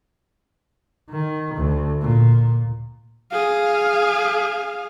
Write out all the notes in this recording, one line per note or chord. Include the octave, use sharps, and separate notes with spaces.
D#3
D2
A#2
G#4 F5